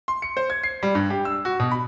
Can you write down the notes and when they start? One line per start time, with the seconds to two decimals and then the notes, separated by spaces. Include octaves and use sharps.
0.08 C6
0.22 C#7
0.37 C5
0.50 G#6
0.64 C7
0.83 G3
0.95 G2
1.10 G4
1.25 E6
1.45 F#4
1.60 B2
1.71 B5